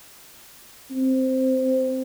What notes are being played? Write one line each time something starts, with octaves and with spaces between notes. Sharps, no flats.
C4